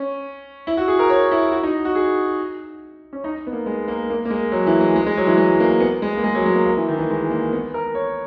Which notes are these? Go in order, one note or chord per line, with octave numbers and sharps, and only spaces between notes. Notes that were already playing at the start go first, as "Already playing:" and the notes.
Already playing: C#4
E4
F#4
G#4
A#4
C#5
E4
F#4
D#4
F#4
G#4
C#4
D#4
B3
A#3
G#3
A#3
A#3
A#3
G#3
F#3
E3
G#3
G#3
G#3
F#3
E3
G#3
A#3
B3
G#3
A#3
G#3
F#3
G#3
A#3
A#3
E3
D#3
E3
G#3
A#3
B3
A#4
C#5